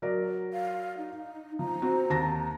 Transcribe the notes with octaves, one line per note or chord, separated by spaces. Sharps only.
F#3 A#4 D5
F5
D#4
F3 A#5
C4 F#4
D#2 A5 A#6